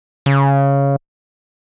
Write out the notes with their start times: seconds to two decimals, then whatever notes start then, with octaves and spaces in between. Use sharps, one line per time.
0.26 C#3